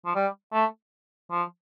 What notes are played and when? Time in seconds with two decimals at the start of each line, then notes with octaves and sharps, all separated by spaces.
0.05 F3
0.15 G3
0.53 A3
1.31 F3